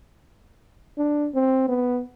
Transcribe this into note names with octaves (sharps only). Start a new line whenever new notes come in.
D4
C4
B3